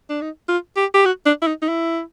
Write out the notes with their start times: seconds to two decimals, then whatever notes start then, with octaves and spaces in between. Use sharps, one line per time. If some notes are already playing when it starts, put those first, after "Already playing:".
0.10 D4
0.21 D#4
0.49 F4
0.77 G4
0.94 G4
1.05 F#4
1.26 D4
1.42 E4
1.47 D#4
1.62 D#4
1.69 E4